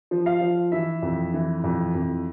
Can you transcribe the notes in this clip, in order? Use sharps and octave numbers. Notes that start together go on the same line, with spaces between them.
F3
F5
F3
E3 E5
F2
E3
F2
F2